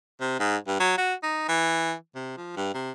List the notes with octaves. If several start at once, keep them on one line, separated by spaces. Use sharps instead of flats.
C3
G#2
G2
F#3
F#4
D#4
E3
C3
F3
G2
C3